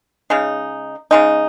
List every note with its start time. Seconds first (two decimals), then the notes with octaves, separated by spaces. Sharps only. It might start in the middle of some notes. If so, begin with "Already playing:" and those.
0.30 C#3 G#3 D#4
1.11 C#3 G#3 D#4